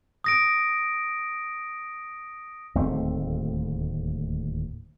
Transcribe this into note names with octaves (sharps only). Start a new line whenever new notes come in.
D#6 A#6 D7
D1 D#2 A3 C4